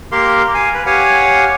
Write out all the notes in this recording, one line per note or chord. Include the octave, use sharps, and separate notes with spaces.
A#3 G4 A#4 F5 C6
F5 G#5
B4
G4 C#5 F5 F#5 G#5